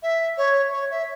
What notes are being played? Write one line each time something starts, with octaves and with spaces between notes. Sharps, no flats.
E5
C#5
C#5
E5